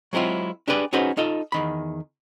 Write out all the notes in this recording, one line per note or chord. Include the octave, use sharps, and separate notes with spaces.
F#3 G#3 C4 E4 F4
D4 G4 G#4 B4 D5
C#4 D#4 F#4 G#4 B4 C5
D#4 F4 A4 D#5
E2 D#3 B5